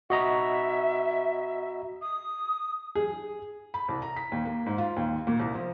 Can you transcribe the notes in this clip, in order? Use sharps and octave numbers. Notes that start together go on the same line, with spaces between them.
F#4 D#5 E5 A#5
D#6
G#4
B5
C2
A#5
B6
D#2
A#3
G#2
F4
D#2
A#2
C2
F3